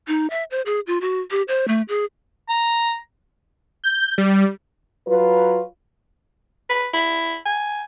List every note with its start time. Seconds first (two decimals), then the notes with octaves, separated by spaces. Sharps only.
0.07 D#4
0.30 E5
0.51 C5
0.66 G#4
0.87 F4
1.01 F#4
1.31 G4
1.48 C5
1.68 A3
1.88 G#4
2.49 A#5
3.84 G6
4.18 G3
5.07 F#3 F4 B4
6.69 B4
6.93 E4
7.45 G#5